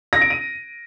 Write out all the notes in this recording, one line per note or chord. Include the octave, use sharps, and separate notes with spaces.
A#6
D7
D#7